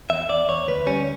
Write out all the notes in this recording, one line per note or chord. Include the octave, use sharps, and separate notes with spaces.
E2 E5
E2 D5
E2 C#5
D2 B4
G3 C#4